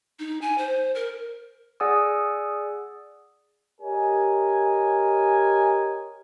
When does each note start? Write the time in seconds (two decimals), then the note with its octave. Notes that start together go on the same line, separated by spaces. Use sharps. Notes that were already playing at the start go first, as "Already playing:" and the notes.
0.19 D#4
0.42 G#5
0.58 C5
0.95 A#4
1.80 G#4 D5 F#5 G#5 D#6 E6
3.81 G4 A#4 C#5 D#5 G#5